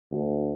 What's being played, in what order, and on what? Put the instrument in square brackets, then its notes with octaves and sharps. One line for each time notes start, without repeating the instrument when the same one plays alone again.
[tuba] D2